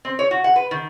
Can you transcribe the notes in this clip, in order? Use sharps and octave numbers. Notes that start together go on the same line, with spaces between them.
C4
C#5
F#4
F#5
B4
D#3